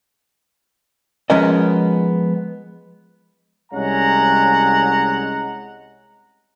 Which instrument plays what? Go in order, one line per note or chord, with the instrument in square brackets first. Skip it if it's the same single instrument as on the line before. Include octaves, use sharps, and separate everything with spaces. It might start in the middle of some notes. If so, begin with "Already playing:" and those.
[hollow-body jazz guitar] F3 G#3 B3 C#4 A#4 D#5
[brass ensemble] C2 G#3 C#4 F#5 A#5